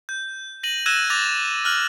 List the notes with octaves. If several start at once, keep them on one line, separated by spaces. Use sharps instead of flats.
G6
A#6 D#7 F#7
E6 F#6 G#6 A#6 D#7 E7
D6 A6 A#6 F7
F6 F#6 F#7